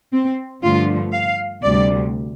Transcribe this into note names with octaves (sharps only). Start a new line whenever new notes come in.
C4
G2 D3 F3 A3 F4
F5
D2 C3 G3 D5